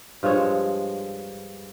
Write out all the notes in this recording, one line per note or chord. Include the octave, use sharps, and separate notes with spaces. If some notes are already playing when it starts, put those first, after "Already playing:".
G2 F3 G#3 C#5